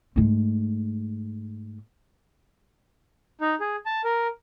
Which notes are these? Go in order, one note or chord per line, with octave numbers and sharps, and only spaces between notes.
G#2 A3
D#4
G#4
A5
A#4